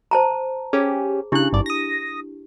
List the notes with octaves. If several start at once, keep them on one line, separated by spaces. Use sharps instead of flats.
C5 A5 A#5
C#4 G4 G#4
C#3 D4 E4 G4 F#6
G#1 G2 D5
D#6 A#6